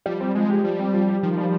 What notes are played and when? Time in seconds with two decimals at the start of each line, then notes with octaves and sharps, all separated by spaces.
0.06 F3 G3
0.21 C4
0.35 F3 G#3
0.50 G4
0.64 F3 G3
0.79 C4
0.94 F3
1.08 G4
1.23 D#3 F3
1.37 G3